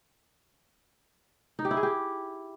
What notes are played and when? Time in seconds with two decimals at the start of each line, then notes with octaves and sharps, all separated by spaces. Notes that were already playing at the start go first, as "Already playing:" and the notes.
1.59 D#4
1.65 G4
1.71 E4
1.77 G#4
1.83 G4